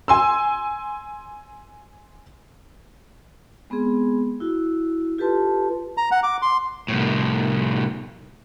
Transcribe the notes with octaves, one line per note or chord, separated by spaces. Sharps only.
G#5 C6 E6
G#3 B3 C4 G#4
E4 F#4
F4 G4 A4 B4 A5 C6
A#5
F#5
D6
C6
C2 A2